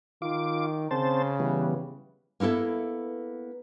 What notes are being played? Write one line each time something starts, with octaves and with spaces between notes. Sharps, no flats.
D#3 F4 D6
C#3 C4 C5 A5
E3 G3 B3
A#3 B3 E4 A4 E5